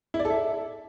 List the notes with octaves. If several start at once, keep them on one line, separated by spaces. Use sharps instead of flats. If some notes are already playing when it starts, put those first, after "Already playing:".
E4
D5
A4
E5